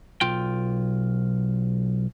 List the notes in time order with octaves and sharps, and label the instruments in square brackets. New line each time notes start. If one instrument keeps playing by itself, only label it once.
[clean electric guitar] B1 F4 G5